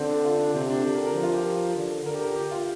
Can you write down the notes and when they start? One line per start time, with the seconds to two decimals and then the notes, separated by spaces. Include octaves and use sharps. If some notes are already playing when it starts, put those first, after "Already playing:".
Already playing: D3 C4
0.09 D4
0.25 F4
0.39 D4
0.55 C3 C4
0.70 D4
0.85 D3 G4
0.95 A#4
1.05 A#4
1.15 F3
1.23 F4
1.34 G4
1.45 A#4
1.76 D3
2.05 D3 A#4
2.14 G4
2.21 A#4
2.35 G4
2.51 F4